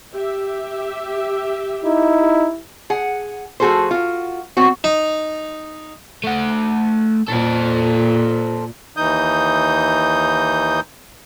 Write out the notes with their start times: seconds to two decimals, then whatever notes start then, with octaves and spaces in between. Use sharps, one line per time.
0.13 G4 E5
1.85 D#4 E4
2.90 G#4 F#5
3.60 F3 A3 F#4 G#4 A4 C5
3.91 F4 F#4
4.57 F#3 C4 F#4
4.84 D#4
6.24 A3 F#5
7.28 A#2 A4 C5
8.97 D#2 E3 D#4 D#6 G6